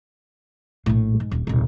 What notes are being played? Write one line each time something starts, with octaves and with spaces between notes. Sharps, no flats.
A#1 A2
G#2
D#1 G3
D#1 C2